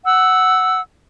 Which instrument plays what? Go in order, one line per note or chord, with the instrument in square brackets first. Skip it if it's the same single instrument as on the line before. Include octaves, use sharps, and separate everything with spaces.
[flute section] F#5 E6